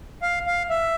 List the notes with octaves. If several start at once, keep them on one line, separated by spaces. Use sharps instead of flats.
F5
F5
E5